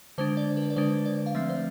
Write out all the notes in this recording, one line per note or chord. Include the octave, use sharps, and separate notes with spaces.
D3 G#3 D4 C5
D5
B4
D5
D3 G#3 D4 C5
D5
F5
F3 A3 C4 E5
C5